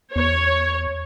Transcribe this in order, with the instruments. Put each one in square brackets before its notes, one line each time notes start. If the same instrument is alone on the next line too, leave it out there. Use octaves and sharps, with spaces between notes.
[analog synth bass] E2 [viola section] C#5